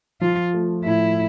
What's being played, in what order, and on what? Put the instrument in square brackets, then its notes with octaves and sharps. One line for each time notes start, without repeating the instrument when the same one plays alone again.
[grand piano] F3 [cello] F4
[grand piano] A3
[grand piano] A2 [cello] E4